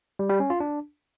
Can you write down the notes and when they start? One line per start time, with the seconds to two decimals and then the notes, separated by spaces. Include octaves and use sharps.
0.19 G3
0.30 G3
0.40 C#4
0.50 F4
0.60 D4